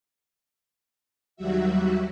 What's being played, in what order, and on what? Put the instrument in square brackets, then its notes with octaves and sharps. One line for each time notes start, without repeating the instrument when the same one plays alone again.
[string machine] D#2 F#3 G3 F#4 E5